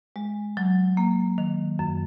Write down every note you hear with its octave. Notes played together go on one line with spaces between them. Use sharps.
G#3
F#3
A#3
D#3
F#2